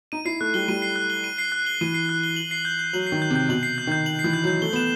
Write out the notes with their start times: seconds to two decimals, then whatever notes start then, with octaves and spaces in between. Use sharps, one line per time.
0.12 D#4 D#7
0.25 E4 C7
0.41 A3 F#6
0.54 G3 G7
0.68 G3 D#7
0.82 C7
0.96 F#6
1.10 G7
1.24 D#7
1.38 C7
1.52 F#6
1.66 G7
1.81 E3 D#7
1.94 C7
2.09 F#6
2.23 G7
2.36 F#7
2.51 C7
2.65 G6
2.79 G6
2.93 F#3 F#7
3.07 C7
3.12 D#3
3.22 G6
3.30 C3
3.36 G6
3.49 B2 F#7
3.63 C7
3.78 G6
3.87 D#3
3.92 G6
4.06 F#7
4.19 C7
4.24 E3
4.33 G6
4.44 F#3
4.47 G6
4.62 A3 G7
4.73 B3 E7